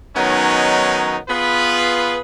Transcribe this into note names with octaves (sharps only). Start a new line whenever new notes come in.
D#3 F#3 G#3 B3 C#4 D#4
B3 F4 G#4 B4